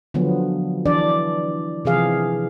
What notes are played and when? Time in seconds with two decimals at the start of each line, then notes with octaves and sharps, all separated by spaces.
0.14 D3 F3 F#3 B3
0.86 E3 D4 D5
1.85 C3 E3 F3 G#4 F5